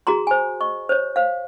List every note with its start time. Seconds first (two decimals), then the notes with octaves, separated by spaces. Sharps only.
0.07 F#4 G#4 A#5 C6
0.27 C5 G#5
0.61 D#5 C#6
0.89 C5 C#5
1.16 C5 F5